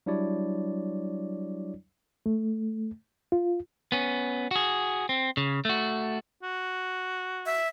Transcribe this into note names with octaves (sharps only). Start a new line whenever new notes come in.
F#3 G3 D4 E4 C#5 D5
A3
F4
B3 C#4
F#4 G#4
C4
C#3
A3 F#4
F#4
E5